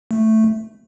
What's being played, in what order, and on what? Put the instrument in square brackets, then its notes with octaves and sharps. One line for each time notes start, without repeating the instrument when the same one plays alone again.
[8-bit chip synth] A3